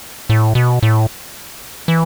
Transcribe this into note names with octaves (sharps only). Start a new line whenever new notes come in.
A2
B2
A2
E3